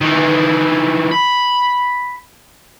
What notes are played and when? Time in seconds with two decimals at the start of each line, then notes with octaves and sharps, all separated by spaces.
0.01 D#3 E3
1.11 B5